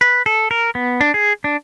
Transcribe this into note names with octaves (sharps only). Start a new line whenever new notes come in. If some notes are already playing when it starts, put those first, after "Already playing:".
B4
A4
A#4
B3
D4
G#4
D4